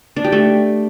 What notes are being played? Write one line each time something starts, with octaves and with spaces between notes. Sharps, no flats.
D4
G4
A3